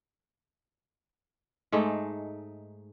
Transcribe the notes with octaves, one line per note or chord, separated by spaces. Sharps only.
G#2 A3 D#4 G#4